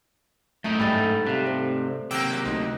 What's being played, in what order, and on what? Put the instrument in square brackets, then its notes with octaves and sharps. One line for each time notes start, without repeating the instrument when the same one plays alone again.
[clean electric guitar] F#2 A2 D#4 [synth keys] A3
[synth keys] G#2 G3 A3 [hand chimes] B5 A6
[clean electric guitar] C3 [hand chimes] F5 F#6
[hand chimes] C4 A4 C5
[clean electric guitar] C3 F#3 A#3 [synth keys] G5 D6 E6
[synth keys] D2 D#4 [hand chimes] C6